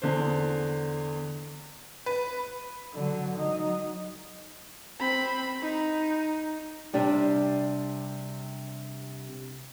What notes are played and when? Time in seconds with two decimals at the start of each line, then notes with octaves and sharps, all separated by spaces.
0.02 E2 D3 C5
2.06 B4
2.94 D3 F#3
3.38 F#3 D#4
5.00 C4 B5
5.62 D#4
6.93 C3 G3 D4 G4